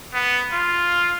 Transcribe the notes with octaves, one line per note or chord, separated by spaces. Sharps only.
B3
F4